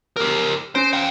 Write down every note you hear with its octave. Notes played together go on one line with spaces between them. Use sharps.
G4 A#4
C#4 C5 C7 D7
F5 G5